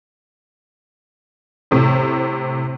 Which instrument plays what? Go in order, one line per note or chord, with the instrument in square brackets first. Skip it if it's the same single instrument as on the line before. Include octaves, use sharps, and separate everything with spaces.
[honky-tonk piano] A2 C3